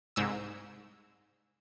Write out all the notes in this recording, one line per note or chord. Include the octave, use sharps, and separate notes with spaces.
C2 G#2 E6